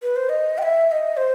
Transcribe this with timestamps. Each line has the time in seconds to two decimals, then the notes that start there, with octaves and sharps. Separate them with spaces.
0.03 B4
0.16 C5
0.29 D#5
0.58 G5
0.62 E5
0.87 E5
0.92 D#5
1.17 C5